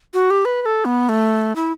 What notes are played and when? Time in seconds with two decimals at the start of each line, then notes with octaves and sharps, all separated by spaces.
0.14 F#4
0.30 G4
0.45 B4
0.62 B4
0.66 A4
0.85 B3
1.09 A3
1.56 E4